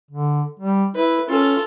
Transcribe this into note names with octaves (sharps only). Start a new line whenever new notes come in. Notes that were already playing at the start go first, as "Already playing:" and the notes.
D3
G3
E4 B4
C#4 F4 A4